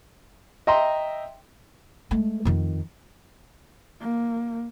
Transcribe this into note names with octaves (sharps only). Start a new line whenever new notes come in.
D#5 E5 G5 A#5 C6
G#3 A3
F2 D#3
A#3